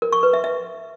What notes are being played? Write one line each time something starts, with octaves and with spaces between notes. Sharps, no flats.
A#4
C#6
B4
E5
E5